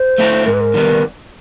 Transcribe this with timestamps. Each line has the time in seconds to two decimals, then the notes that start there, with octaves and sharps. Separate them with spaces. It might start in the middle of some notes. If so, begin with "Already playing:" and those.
Already playing: C5
0.18 A3 C4 E4 A4
0.46 G#2 A#4
0.53 B4
0.61 A#4
0.74 D#3 G3 B3